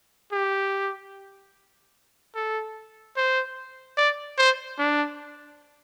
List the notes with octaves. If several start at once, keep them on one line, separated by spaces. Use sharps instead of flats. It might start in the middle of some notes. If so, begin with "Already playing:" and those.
G4
A4
C5
D5
C5
D4